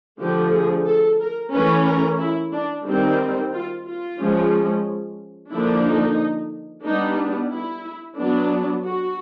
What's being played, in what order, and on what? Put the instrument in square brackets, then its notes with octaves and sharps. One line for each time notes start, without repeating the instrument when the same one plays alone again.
[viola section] D3 F3 A3 G4
G#4
A4
A#4
E3 A3 C#4 B4
A#4
E4
D4
D#3 G3 C4
F4
F4
F3 G#3 C#4
D3 F3 A#3 D4 E4
D#4
G3 B3 D4 D#4
E4
F#3 B3 D4
F#4